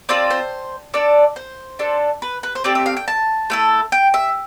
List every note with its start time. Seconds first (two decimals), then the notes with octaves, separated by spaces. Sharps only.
0.09 C4 F4 A4 D5
0.30 C5
0.94 D4 A4 D5
1.36 C5
1.79 D4 A4
2.22 B4
2.43 B4
2.55 C5
2.64 A3 C4 G4 D5
2.75 E5
2.86 F5
2.97 G5
3.08 A5
3.50 A3 E4 A4
3.92 G5
4.14 E5